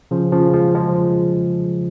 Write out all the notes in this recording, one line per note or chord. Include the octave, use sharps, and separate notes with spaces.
C#3 F3
C#3 F3
F3 G#3
F3 G#3